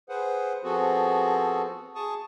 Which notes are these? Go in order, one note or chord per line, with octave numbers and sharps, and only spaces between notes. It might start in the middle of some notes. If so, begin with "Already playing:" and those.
G#4 B4 C5 F#5
F3 B3 C4 F#4 G#4 A4
G#4 A5 C#6 D#6